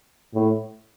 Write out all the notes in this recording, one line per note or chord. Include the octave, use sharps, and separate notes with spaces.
A2